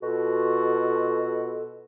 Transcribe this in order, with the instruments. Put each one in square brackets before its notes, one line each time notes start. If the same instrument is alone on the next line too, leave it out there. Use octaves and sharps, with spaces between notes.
[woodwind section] B2 F4 F#4 A4